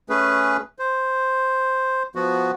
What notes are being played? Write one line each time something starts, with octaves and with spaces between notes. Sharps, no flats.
A3 C#4 G#4 B4
C5
F3 B3 F#4